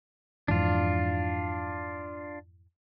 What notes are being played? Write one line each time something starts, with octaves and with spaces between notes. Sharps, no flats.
F2 G#2 E3 D4 F4